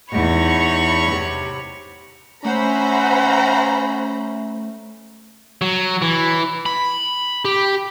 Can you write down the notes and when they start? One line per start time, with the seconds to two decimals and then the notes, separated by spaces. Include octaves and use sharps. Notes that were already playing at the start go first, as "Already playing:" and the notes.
0.12 E2 D#4 C#5 B5 C#6
1.11 C3
2.44 A3 C#4 C5 E5 F#5 A#5 B5
5.62 F#3
6.02 E3
6.66 B5
7.45 G4